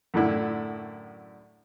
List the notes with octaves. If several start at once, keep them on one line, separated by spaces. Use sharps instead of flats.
F#2 A2 D3 E4